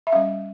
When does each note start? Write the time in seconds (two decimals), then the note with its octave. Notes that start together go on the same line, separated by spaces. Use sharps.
0.07 E5
0.12 G3 C#4 F5